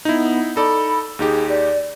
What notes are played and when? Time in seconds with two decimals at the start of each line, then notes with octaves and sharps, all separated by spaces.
0.05 B3 D#4 E4
0.56 D#4 A4 D5 B5
1.19 D#2 D#4 G4 G#4
1.49 D5